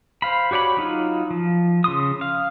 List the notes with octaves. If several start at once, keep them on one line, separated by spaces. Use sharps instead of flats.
C5 F5 B5
F#4 G4 C#5 D5 B5
F#3 D#4 F4
F3
C#3 C6 D#6
F5